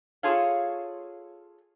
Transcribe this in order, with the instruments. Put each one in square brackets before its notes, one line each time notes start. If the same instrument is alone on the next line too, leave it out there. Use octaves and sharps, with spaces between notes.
[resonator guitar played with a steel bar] F4 G#4 A4 C#5 F5